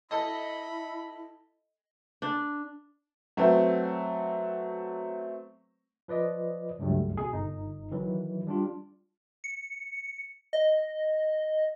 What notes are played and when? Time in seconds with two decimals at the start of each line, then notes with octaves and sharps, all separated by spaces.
0.11 E4 A4 D#5 B5
2.22 D4
3.37 F#3 A3 B3 C4
6.08 F3 B4 D5 D#5
6.79 C#2 G2 F#3 G3 A3
7.17 B2 G#4
7.32 G1 D#4
7.91 D#3 E3 F#3
8.47 G3 D4 F4
9.44 C#7
10.53 D#5